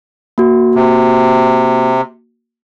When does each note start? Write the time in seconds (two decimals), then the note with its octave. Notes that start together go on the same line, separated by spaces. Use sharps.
0.38 A#3 F#4
0.75 C3